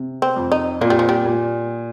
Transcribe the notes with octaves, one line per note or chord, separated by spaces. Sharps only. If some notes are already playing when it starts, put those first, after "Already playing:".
Already playing: C3
C4
F2
D#4
A#2 A#3
G3
F3
G3
A#2